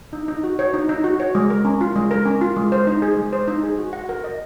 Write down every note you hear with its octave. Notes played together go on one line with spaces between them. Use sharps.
D#4
D#4
F#4
C#5
D#4
D#4
F#4
C#5
G#3
A#4
C#4
F4
G#3
A#4
C#4
F4
G#3
C5
D#4
G#4
G#3
C5
D#4
G#4
F#4
F#5
A#4
D#5